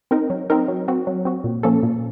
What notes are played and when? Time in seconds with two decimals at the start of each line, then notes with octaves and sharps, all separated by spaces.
0.11 C4 D#4 A#4
0.30 F#3
0.50 C4 D#4 A#4
0.68 F#3
0.88 C4 F#4
1.07 F#3
1.25 C4 F#4
1.44 A#2
1.63 F3 A#3 C#4 A4
1.83 A#2